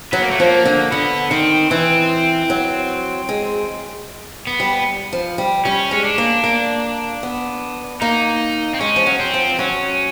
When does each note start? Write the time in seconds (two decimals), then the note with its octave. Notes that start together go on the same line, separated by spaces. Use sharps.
0.12 F#3 B3
0.22 A#3
0.31 A3
0.40 F3 A#3
0.65 D3
0.92 D3 B3
1.31 D#3 C4
1.71 E3 C4
2.50 F#3
3.29 G#3
4.47 B3
4.60 G3
5.13 F3
5.38 G3
5.65 G3 C#4
5.91 G#3 C#4
6.05 D4
6.18 A#3
6.44 A#3
7.23 B3
8.01 A#3 D#4
8.74 C4
8.80 G#3 C#4
8.96 F3
9.07 F#3
9.20 C4
9.34 F3
9.59 F#3 C#4